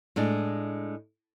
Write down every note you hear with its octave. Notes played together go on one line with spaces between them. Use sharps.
A2 G#3 D4